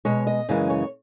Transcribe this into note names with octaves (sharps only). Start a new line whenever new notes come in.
B2 G#3 C#5
D#5
F#2 C#3 E3 G#3
C#5